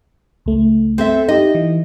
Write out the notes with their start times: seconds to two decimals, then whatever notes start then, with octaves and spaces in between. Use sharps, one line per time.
0.46 C#2 A3
0.98 C4 A4 E5
1.29 D#4 G4 D#5
1.55 E3